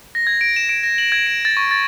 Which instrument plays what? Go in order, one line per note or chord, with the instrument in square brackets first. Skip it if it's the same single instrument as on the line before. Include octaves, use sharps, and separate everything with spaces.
[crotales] A#6
G#6
D7
E7
D7
A#6
F#7
G#6
D7
A6
C#6
A6